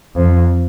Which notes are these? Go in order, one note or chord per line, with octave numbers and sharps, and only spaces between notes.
F2